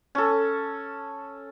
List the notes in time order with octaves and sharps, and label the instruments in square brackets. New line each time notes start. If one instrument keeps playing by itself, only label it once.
[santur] C#4 A4